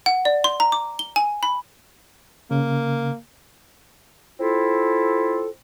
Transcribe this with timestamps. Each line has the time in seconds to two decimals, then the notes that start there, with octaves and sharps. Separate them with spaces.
0.06 F#5
0.25 D5
0.44 C6
0.60 A#5
0.72 D6
0.99 G7
1.16 G#5
1.43 B5
2.51 C#3 A#3
4.40 C4 E4 F4 A4